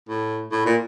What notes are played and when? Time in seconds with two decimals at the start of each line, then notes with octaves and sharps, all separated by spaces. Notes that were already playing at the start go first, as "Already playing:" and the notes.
0.09 A2
0.52 A2
0.66 A#2